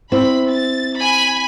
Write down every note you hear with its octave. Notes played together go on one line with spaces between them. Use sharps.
C4 E4 B5
A6
G#5 B5